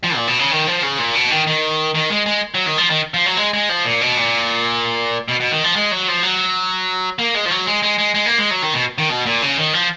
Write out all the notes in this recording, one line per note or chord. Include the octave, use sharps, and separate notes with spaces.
F3
A#2
B2
C#3
D#3
F3
C#3
A#2
B2
D#3
D#3
D#3
G#3
G#3
F#3
D#3
F3
D#3
F3
F#3
G#3
G#3
F3
A#2
B2
A#2
B2
B2
D#3
F3
G#3
F#3
F3
F#3
A#3
G#3
F3
F#3
G#3
G#3
G#3
G#3
A#3
G#3
F#3
D#3
B2
D#3
B2
A#2
C#3
D#3
F3